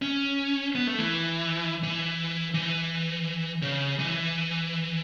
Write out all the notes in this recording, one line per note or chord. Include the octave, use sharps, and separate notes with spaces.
C#4
B3
A3
E3
E3
E3
C#3
E3